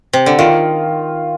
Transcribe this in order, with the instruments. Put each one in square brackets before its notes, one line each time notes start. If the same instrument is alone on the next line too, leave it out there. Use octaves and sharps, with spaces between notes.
[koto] C3
D3
[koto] D#3 [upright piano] F4